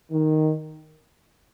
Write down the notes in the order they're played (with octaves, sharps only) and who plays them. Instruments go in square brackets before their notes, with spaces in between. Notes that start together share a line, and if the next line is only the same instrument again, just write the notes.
[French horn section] D#3